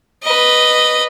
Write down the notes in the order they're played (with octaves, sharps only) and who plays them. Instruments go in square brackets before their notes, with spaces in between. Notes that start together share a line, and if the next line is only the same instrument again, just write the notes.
[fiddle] B4 D#5